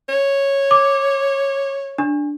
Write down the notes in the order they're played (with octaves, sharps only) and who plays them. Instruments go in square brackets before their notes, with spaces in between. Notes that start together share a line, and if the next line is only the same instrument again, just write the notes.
[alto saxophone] C#5
[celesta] D6
D4